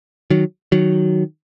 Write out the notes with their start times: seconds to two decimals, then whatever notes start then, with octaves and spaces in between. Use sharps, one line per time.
0.30 D#3 F#3
0.72 D#3 F#3